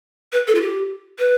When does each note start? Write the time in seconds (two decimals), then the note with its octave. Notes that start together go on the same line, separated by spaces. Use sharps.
0.33 B4
0.47 A4
0.55 F4
0.61 G4
1.19 B4